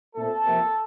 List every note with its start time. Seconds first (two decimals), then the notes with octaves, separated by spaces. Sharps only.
0.15 A#2 A3 C4 A4
0.45 C3 F3 A#3